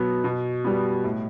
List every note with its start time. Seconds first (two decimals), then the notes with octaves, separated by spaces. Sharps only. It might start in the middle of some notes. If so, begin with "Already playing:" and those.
Already playing: B2 F#3 B3
0.24 B2
0.64 G3 B3
1.04 A2